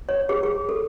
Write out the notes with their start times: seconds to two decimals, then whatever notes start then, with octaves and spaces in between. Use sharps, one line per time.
0.09 C#5
0.29 G#4
0.43 G#4
0.69 A4